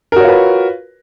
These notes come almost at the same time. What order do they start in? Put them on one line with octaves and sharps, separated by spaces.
A#4 F#4 C#5 F4 B4